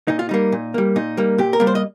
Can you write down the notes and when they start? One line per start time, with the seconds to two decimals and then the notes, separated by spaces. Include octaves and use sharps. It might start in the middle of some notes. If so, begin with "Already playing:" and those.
0.08 A#2 D#4
0.19 F4
0.29 G3 A#3 D#4
0.52 A#2
0.74 G3 A#3
0.96 A#2 D#4
1.17 G3 A#3
1.38 A#2 G4
1.53 A#4
1.60 G3 A#3
1.67 C5
1.75 D#5